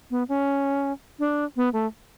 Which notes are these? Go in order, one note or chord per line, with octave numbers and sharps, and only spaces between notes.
B3
C#4
D4
B3
A3